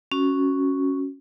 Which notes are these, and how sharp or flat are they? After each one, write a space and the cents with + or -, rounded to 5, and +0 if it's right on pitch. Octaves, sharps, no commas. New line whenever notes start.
C#4 +0 F#4 +0